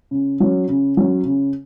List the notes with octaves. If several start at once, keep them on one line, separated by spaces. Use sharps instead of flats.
C#3
F#3 C#4
C#3
F#3 C#4
C#3